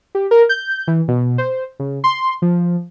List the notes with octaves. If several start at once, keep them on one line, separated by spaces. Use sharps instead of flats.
G4
A#4
G6
E3
B2
C5
C#3
C6
F3